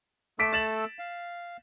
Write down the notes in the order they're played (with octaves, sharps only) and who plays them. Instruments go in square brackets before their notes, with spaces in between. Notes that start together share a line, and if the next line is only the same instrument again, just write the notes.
[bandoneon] A3 A4 E6 [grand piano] D6 B6 D7
[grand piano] A6 E7 F#7
[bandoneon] F5